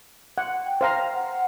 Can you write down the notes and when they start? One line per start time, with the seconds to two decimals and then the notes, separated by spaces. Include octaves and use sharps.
0.38 F#5
0.66 G5
0.81 C5 F5 A#5
1.14 F#5